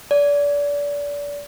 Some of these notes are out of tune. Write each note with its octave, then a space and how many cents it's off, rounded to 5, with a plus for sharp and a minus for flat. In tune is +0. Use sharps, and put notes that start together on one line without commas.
D5 -30